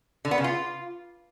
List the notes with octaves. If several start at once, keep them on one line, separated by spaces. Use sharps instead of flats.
D3
B3
C#3
F4